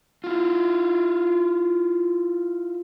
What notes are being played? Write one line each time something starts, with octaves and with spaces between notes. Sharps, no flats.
E4 F4